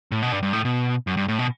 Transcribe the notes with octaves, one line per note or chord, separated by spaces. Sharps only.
A2
B2
G2
G2
A2
B2
F#2
G2
A2
B2